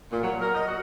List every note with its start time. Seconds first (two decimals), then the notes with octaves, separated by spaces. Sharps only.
0.11 A#2
0.23 F#3
0.41 A#4
0.55 D#5
0.67 F#4